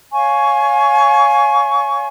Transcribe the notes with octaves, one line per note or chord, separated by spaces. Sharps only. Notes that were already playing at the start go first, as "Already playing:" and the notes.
C#5 F5 G#5 C#6